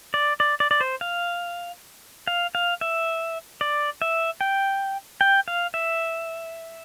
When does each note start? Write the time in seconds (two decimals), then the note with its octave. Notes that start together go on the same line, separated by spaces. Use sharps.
0.14 D5
0.40 D5
0.60 D5
0.71 D5
0.81 C5
1.01 F5
2.27 F5
2.55 F5
2.81 E5
3.61 D5
4.02 E5
4.41 G5
5.21 G5
5.48 F5
5.74 E5